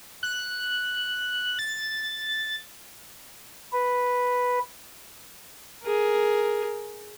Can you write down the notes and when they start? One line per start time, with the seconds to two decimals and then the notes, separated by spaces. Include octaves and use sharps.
0.23 F#6
1.59 A6
3.73 B4
5.83 G#4 A#4